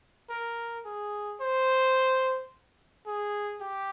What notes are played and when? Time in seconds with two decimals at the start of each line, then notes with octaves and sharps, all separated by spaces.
0.30 A#4
0.85 G#4
1.41 C5
3.07 G#4
3.61 G4